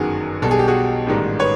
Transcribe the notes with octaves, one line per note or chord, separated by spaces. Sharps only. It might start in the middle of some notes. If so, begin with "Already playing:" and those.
Already playing: G1 F#2 D#3 F#4 G#4
B1 B2 G3 A4
G#4
G4
F#4 G#4
A1 G#2 D#3 G3
B4 C#5